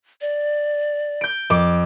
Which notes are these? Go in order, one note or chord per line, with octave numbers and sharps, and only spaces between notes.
D5
G6 D7
F2 D6